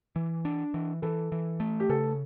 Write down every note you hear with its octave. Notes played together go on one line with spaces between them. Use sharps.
E3
D4
E3
E3 A4
E3
A3
G4
C#3 A4